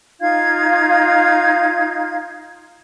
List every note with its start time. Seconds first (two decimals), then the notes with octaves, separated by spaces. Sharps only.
0.20 D#4 F4 F5 G#6